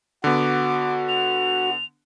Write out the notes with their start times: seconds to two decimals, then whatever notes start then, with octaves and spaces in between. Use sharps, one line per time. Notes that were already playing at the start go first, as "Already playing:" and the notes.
0.24 D3 B3 F#4 D6
1.09 F7